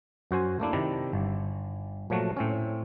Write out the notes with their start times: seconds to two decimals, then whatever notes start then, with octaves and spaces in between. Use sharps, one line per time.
0.31 F#2 F#4 C5 G#5
0.60 A3 A#3 D4 E4
0.73 C3 D#3 E4 D5
1.13 G1
2.10 A#2 F3 F#3 A3 F#4
2.37 A2 C4 C#4